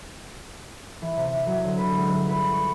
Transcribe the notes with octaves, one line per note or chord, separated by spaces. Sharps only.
E3
C3
F#3
D3
B4
G#3
G1
B4
C#6